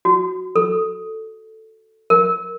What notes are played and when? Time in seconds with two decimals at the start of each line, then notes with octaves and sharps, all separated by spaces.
0.05 F#4
0.56 A4
2.10 A#4